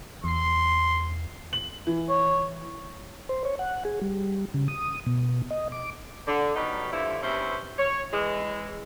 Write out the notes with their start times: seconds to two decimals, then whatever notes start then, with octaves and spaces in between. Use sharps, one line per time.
0.24 E2 C6 C7
1.53 F#7
1.87 E3
2.09 C#5
3.29 C5
3.45 C#5
3.59 F#5
3.85 G#4
4.02 G3
4.54 C#3
4.68 D#6
5.06 B2
5.50 D#5
5.72 D6
6.27 D3
6.56 F#3 G3 B3 C#4 D#4
6.93 G2 D3 F3 A3 E4
7.23 E2 G2 C3 C#4 E4 C5
7.78 C#5
8.12 E3 G#3